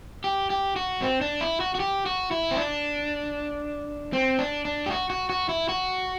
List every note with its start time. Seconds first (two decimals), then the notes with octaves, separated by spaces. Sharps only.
0.24 G4
0.50 G4
0.76 F#4
1.02 C4
1.21 D4
1.41 E4
1.60 F#4
1.75 F#4
1.80 G4
2.06 F#4
2.31 E4
2.51 C4
2.57 D4
4.13 C4
4.39 D4
4.65 D4
4.86 G4
4.91 F#4
5.10 F#4
5.30 F#4
5.49 E4
5.69 F#4